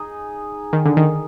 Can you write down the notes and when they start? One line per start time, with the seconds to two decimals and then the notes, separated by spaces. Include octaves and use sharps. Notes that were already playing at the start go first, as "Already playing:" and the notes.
Already playing: D#4 G#4
0.73 D#3
0.86 D3
0.97 D#3